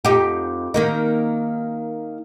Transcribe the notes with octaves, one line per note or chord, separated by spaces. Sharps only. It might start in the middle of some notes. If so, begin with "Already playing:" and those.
F2 D#4 G4
D#3 A#3 D#4